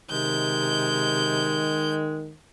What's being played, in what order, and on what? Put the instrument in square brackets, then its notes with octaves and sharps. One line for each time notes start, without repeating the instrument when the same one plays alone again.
[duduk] C3 [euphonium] D#3 [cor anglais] G#3 [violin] G6